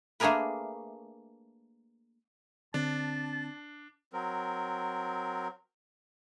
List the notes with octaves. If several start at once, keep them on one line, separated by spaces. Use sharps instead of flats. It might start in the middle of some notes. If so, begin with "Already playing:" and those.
A3 A#3 D4 G#4 A#4 B4
D3 C4 D4 A5
F#3 C4 A#4